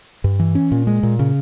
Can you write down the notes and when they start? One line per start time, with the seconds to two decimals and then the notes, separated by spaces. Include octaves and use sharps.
0.24 G2
0.40 E3
0.55 C#4
0.72 A#2
0.87 G#3
1.03 A#2
1.19 C#3